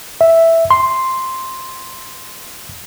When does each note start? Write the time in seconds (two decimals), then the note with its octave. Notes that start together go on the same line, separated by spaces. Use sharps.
0.21 E5
0.71 C6